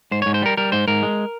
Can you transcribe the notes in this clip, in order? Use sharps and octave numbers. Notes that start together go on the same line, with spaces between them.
G#2 C5
G#2 C#5
C5
G3 A#4
G3 A#4
G#2 C5
G#2 A#4
G#3